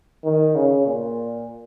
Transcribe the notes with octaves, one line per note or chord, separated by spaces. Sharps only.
D#3
C#3
A#2